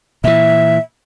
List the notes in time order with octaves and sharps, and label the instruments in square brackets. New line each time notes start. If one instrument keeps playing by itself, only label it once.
[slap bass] A#2 E3 [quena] E5